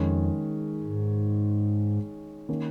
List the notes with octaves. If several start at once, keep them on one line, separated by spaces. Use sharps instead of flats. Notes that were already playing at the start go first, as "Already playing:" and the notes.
Already playing: F2 D#3 G#3 C#4
G#2
D#3 A#3 C#4